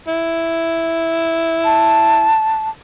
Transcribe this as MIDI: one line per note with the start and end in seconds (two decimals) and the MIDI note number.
0.07 2.28 64
1.65 2.70 81